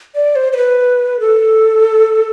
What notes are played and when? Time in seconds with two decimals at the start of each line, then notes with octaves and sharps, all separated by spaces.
0.15 D5
0.36 C5
0.52 C5
0.57 B4
1.20 A4